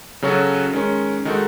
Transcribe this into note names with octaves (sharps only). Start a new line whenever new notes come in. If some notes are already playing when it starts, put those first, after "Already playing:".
C#3 F#3 C#4 F#4 A4
D#3 G#3 C#4
D#3 G#3 D#4 F#4 A4